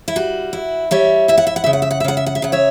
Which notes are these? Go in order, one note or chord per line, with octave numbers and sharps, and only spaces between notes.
E4
G3 F#4
E4
G3 C#5 E5
E4 E5
F#5
E5
F#5
C#3 E5
F#5
E5
F#5
E5
C#3 F#5
E5
F#5
E5
C#3 F#5
C#5 E5